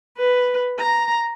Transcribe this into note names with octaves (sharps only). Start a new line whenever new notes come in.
B4
A#5